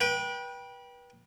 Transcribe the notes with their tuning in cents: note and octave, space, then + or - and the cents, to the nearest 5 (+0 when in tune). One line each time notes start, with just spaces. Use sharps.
B4 -30 G5 +0